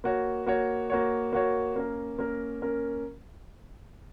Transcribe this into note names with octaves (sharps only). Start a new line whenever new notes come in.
A#3 F#4 C#5
A#3 F#4 C#5
A#3 F#4 C#5
A#3 F#4 C#5
A#3 C#4 A#4
A#3 C#4 A#4
A#3 C#4 A#4